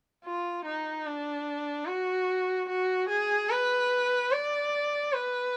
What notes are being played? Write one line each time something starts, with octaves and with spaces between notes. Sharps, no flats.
F4
D#4
D4
F#4
F#4
G#4
B4
D5
B4